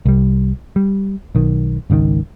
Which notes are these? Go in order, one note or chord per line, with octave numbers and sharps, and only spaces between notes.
C2 G3
G3
B1 D#3
G#1 C#2 B2 D#3